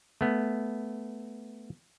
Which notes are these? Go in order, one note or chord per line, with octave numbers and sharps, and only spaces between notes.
A3 B3